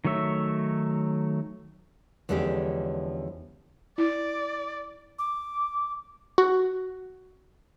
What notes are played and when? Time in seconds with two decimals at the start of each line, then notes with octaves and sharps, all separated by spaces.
0.05 D#3 F#3 A3 C#5 E5
2.29 E2 D3 F3 G#3 C#4 G4
3.98 E4 D5
5.19 D6
6.38 F#4